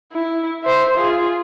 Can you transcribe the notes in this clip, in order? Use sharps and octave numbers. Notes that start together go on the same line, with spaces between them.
E4
C5 E5
F4 G#4